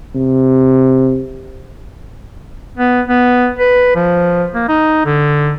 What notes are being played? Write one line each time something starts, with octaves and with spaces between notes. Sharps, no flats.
C3
B3
B3
B4
F3
A#3
D#4
D3